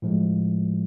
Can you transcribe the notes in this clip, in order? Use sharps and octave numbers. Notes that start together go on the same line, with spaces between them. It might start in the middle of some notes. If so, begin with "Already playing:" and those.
A2 F3 G#3